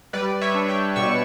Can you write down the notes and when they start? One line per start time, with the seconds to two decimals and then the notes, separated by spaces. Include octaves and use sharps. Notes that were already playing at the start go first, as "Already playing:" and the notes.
0.13 G3 B4 D5
0.41 C#5 E5
0.54 D4
0.68 E5 G5
0.96 B2 C#6 E6